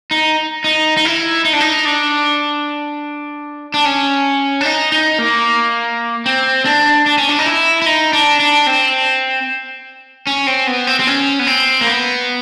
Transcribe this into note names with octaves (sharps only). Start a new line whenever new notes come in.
D#4
D#4
D#4
E4
D#4
D4
D#4
D4
D4
C#4
D4
D#4
D#4
A#3
C4
D4
D4
C#4
D4
D#4
E4
E4
D#4
D4
D4
C4
C#4
C4
B3
C4
C4
C#4
B3
C4
A#3
B3